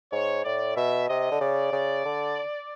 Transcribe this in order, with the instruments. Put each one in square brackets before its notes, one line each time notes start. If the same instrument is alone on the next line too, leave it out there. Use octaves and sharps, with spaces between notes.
[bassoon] G#2 [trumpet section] C#5
[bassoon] A2 [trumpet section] D5
[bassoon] B2 [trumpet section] E5
[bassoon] C3 [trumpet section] D#5
[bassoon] D3
[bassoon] C#3 [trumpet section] D5
[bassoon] C#3
D3